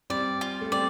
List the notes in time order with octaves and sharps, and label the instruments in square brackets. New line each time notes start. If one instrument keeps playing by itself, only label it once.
[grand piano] G3 C4 [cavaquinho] D5
[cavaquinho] F4
[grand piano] A3
[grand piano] G3 C4 [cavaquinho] D5